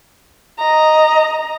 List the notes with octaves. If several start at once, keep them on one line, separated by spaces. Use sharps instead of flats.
D#5 A#5